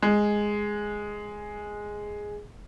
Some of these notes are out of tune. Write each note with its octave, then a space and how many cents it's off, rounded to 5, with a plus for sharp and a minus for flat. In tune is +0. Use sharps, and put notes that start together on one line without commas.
G#3 +0